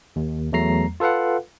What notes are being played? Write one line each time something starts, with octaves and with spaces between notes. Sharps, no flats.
D#2
E2 F#3 A3 A#5 C7
F4 A4 B4 F5 F#5